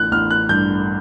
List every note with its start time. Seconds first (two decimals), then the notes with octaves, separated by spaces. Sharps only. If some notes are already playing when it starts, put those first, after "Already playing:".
Already playing: A1 F#6
0.12 A1 F6
0.31 F#6
0.49 G2 G6